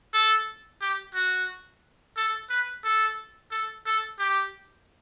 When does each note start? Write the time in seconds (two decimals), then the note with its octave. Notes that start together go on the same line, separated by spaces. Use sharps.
0.14 A4
0.81 G4
1.14 F#4
2.17 A4
2.50 B4
2.84 A4
3.51 A4
3.86 A4
4.19 G4